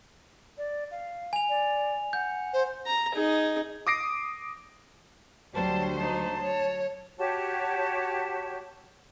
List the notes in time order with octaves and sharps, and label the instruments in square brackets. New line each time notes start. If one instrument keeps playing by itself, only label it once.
[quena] D5
F5
[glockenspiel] G#5 F7
[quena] D5
[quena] F#5 [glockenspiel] G6
[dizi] C5
[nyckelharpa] A#5
D#4 G#4
[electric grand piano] D6 D#6 A#6 C7 D7
[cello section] D2 F#3 C5 [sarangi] G3 [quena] A5
[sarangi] D#4 [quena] A5
[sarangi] C#5
[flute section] F#4 G4 C#5 A5